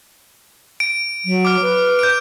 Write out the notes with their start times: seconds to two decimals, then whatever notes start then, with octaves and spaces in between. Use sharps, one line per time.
0.80 D7
1.25 F#3
1.45 D6 F6
1.62 B4
1.99 G6 D7